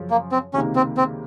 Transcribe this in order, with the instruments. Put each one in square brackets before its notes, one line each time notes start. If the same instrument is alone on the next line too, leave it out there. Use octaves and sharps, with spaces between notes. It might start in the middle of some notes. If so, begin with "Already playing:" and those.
Already playing: [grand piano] F#2 C#3 F3
[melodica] A#3
C4
[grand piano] C#2 C3 D#3 A#3 [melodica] C#4
[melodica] C4
C4